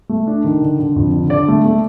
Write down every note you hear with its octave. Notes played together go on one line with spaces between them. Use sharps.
A3
D4
D#3
D3
D3
F2
D3
D3 D5
A3
A3